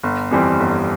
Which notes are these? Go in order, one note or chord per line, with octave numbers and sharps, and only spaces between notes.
G1
F2 E3 G3 C4
G1